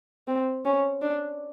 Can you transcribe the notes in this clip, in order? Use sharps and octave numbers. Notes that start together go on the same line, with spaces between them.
C4
C#4
D4